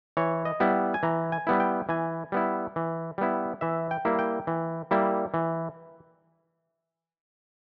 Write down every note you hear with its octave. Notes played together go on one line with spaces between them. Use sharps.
E3 C#5
D#5
G3 B3 E4
G#5
E3 A#5
G#5
G3 B3 E4
G5
E3 G#5
G3 B3 E4
E3
G3 B3 E4
E3 E5
G5
G3 A#3 E4
G5
E3
G3 A#3 E4
E3